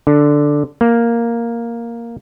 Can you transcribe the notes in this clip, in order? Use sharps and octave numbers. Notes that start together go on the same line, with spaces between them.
D3
A#3